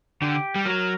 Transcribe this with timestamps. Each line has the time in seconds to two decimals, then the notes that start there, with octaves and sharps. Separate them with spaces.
0.22 D3 G4
0.55 G3
0.65 F#3 A#4